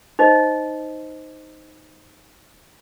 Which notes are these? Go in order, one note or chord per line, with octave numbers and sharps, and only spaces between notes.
D#4 C5 D#5